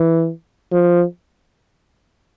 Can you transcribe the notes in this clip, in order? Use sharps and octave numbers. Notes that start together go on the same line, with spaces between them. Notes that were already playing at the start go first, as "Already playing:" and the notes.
Already playing: E3
F3